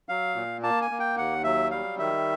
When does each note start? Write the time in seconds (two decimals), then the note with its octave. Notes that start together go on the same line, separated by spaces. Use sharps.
0.09 F#3 F5
0.35 A#2
0.63 A#3 A5
0.82 G#5
0.91 A#3
0.99 G5
1.17 D#2 F#5
1.44 F#3 E5
1.71 G3 F5
1.99 D#3 E5